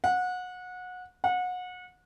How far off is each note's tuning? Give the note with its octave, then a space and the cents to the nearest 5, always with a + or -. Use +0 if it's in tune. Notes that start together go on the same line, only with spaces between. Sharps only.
F#5 -25
F#5 -30